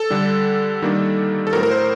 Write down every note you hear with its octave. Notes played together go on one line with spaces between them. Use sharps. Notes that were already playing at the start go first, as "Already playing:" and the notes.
Already playing: A4
D3 G3 D4
D#3 G3 A#3 D4
A4
A2 F#3 C4 A#4
A#4
C5